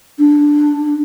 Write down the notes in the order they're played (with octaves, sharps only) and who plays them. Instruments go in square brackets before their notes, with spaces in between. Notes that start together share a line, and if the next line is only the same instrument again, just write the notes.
[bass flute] D4